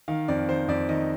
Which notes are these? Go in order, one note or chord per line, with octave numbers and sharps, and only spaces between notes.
D#3 F5
F2 D5
D#3 C5
F2 D5
D#3 D#5